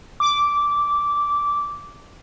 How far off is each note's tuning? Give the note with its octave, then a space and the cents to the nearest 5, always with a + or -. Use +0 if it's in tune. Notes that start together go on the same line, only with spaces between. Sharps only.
D6 -10